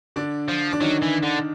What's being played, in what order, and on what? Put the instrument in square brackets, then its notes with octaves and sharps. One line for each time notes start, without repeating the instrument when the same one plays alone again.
[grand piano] D3 D4
[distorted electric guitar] F3
[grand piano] D4
[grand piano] D#3 D#4 [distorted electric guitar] F#3
[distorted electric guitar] E3
D3